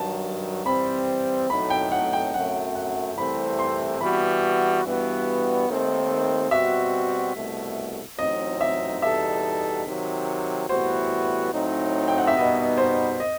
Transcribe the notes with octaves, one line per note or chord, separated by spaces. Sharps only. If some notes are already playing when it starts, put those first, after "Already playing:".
Already playing: G2 D#3 F#3 A5
E3 G3 C4 B5
B1 A2 F#3 A3 D#4 B5
G5
F#5
G5
F#2 F#3 A3 F#5
F#5
C2 C3 E3 A3 C4 B5
C6
E3 G3 B3 F#4 B5
G2 E3 G3 B3 F#4
D#2 D#3 A3 C4
B2 G3 C4 F#4 E5
C2 B2 A3
A1 A2 F#3 C4 D#4 D#5
E5
E2 B2 G3 D#4 A4 E5
C3 D#3 F#3
A2 E3 G3 B3 F#4 C5
A2 F#3 C4 D#4
G5
F#5
E5
B2 G3 B3 D#4 D#5
C5
D#5